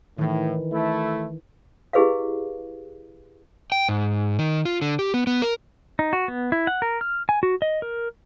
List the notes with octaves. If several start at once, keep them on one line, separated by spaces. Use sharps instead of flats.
A2 D#3 E3
A3 E4
E4 G4 G#4 B4 D#5 F5
G5
G#2
D#3
F4
D3
G4
B3
B3
A#4
D#4
F#4
B3
E4
F#5
A#4
F6
G#5
F#4
D#5
A#4